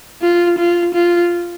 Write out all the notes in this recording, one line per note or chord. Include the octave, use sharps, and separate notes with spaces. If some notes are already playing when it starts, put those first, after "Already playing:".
F4
F4
F4